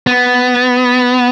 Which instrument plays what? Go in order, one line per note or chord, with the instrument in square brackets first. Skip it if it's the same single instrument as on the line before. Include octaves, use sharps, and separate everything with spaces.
[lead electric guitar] B3